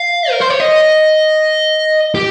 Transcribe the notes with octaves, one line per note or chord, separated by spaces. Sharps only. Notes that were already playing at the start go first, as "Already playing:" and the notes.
Already playing: F5
A#4
C5
C#5
D#5
G4